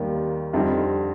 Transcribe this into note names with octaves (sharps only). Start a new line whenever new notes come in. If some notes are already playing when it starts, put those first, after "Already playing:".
Already playing: D#2 D#3 G3 A#3
F2 D3 G3 C4 D#4